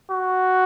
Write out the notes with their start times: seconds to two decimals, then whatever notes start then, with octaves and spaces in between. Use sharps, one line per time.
0.11 F#4